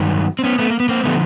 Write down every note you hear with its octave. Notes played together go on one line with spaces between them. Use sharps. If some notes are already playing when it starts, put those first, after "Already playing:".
Already playing: G2 D#3 F#3
C4
B3 C#4
A3 B3
A#3
B3
A#3 C4
D3 F3 A3 B3